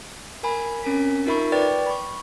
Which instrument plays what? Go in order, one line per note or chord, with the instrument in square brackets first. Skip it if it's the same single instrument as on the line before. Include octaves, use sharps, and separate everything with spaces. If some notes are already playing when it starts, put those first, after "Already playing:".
[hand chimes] A#4 G#5 B5
C4 C#4 A#4 G#5 B6
D#4 F4 A#4 E5 B5 C#6
B4 D5 G5 C#6 A6
B5 C#6